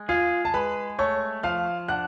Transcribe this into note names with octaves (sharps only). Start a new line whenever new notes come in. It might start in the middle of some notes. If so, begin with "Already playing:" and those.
Already playing: G#3
F4 G#4 F5
A5
G#3 B4 B5
A3 C#5 C#6
F3 F5 F6
D4 F#5 F#6